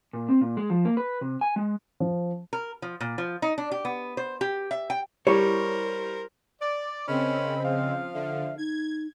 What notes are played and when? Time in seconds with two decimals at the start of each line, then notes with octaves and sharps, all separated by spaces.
0.13 A#2
0.29 C4
0.41 A#2
0.57 G#3
0.70 F3
0.85 A#3
0.97 B4
1.21 C3
1.41 G#5
1.56 G#3
2.00 F3
2.53 A#4
2.82 F3
3.01 A#2
3.18 F3
3.42 D#4
3.58 D4
3.72 G4
3.85 B3
4.17 C5
4.41 G4
4.71 E5
4.90 G5
5.27 G3 E4 G4 A#4 C5 C#5 A#5
6.61 D5
7.08 C#3 C4 C#4 A#4 D#5 B5
7.64 F3 F5
8.14 D3 E5
8.58 D#4 G#6